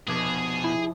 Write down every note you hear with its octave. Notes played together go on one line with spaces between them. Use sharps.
F1 B2 G#4 D5 G#6
E4